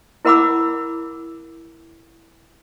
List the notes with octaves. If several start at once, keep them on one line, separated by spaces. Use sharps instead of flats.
E4 A#4 F#5 B5 D6 E6